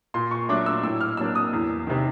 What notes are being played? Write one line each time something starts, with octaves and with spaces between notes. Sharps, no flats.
A#2 C6
C#6
F#3 A3 D4 D6
E6
A2 E6
F6
F#3 A#3 D4 E6
D#6
E2
C3 D#3